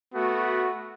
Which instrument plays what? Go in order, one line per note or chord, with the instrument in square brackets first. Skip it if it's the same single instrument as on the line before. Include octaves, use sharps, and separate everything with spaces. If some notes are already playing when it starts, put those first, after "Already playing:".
[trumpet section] A3 B3 F#4